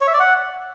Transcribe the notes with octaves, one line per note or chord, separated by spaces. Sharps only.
C#5
E5
D5
F#5